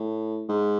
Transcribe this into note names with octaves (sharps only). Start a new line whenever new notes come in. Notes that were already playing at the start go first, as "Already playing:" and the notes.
Already playing: A2
G#2